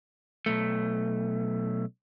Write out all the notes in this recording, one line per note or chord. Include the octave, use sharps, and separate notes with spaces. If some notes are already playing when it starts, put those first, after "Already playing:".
B1 A3